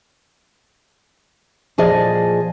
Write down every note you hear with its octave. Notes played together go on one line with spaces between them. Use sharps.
A#2 F3 G#4 D5 D#5